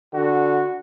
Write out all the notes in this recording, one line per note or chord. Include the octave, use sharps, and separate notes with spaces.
D3 F#4